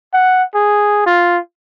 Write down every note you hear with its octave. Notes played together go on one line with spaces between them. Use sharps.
F#5
G#4
F4